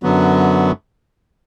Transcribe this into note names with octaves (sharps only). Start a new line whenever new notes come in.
F#2 D3 F#3 B3